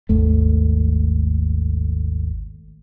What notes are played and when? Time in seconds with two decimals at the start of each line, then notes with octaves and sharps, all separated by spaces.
0.09 G#1 D#2 A3